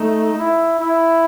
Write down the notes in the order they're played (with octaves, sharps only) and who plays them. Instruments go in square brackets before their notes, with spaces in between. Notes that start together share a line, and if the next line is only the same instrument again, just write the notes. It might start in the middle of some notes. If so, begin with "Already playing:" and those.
Already playing: [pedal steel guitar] A3 [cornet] D#4
[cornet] E4
E4